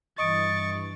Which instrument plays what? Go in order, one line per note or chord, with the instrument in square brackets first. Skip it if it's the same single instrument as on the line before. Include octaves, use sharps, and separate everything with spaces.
[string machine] G2 E3 [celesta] D#5 D#6 D7 [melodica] C#6 [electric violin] A6